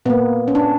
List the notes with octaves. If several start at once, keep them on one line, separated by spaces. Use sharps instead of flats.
A#2 A#3 B3
C#4
D4